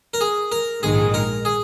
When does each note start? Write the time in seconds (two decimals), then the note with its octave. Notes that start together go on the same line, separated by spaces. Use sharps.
0.14 A#4
0.21 G#4
0.52 A#4
0.83 A#1 G#2 D#3 G#3 G#4
1.14 A#4
1.45 G#4